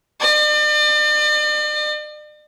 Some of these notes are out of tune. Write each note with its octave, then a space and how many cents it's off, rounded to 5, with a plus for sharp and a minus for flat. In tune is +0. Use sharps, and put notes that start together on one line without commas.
D5 +40